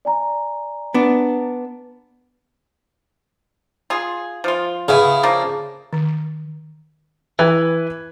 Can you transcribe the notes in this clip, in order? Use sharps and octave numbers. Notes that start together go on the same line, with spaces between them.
D5 G#5 A#5
B3 D4
F4 G#4
F3 F4
C#3 B3 E4
F3 A#3 D4
D#3
E3 B4 F#6 G#6